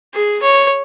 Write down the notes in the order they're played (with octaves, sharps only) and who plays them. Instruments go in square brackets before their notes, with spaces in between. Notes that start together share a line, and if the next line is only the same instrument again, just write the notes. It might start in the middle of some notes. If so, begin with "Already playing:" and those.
[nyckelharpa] G#4
C#5